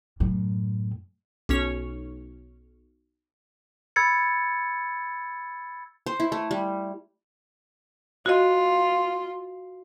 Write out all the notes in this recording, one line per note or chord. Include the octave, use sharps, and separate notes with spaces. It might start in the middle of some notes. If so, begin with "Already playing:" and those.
F#2 A2
B1 C#4 C#5
B5 E6 G#6 A6 C#7
C5
E4
A3
G3
F4 F#4 D#5